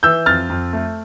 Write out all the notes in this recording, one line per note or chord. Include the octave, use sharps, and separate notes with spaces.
E3 E6 G6
F2 F6 A6
F2
A3